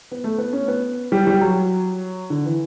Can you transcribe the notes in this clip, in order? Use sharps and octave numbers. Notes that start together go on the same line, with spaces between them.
B3
A3
B3
C#4
B3
G3
G3
F#3
D3
E3